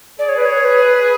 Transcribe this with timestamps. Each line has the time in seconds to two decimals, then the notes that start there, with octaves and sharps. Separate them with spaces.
0.19 G#4 D5
0.29 C#5
0.36 B4
0.45 C#5
0.65 B4